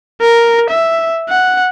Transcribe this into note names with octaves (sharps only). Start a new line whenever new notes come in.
A#4
E5
F#5